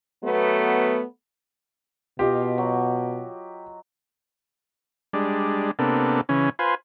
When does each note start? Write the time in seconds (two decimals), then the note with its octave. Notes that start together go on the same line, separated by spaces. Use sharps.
0.24 F#3 A3 B3
2.19 B2 F4 G4 D#5 F5
2.58 F#3
5.13 G3 G#3 D4
5.79 C3 A#3 B3 D4 A4
6.29 C#3 E3 C#4
6.59 F4 B4 C5 G#5